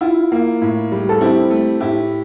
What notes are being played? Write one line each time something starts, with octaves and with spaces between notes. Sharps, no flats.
E4 F4
A#3
A2
G3
A4
C4 E4 G4
A3
A2 E4 G4